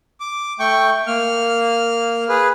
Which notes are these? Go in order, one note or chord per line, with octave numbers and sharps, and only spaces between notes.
D6
A3 G5 C#6
A#3 F6
G#4 B4